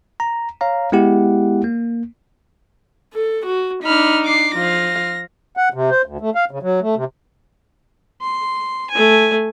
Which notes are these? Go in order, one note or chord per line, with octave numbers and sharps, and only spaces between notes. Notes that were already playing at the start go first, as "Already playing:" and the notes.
A#5
C#5 F5 A#5
G#3 B3 E4 G4 F#5
A#3
A4
F#4
D4 D#4 B5 F6
D6 C7
F3 F5 A#6
F#5
C3
C5
D2
A3
F5
C#3
F#3
A3
C3
C6
A3 G#5